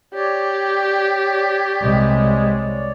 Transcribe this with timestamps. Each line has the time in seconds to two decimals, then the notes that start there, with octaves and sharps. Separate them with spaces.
0.14 G4 C#5 D5
1.81 C2 G#3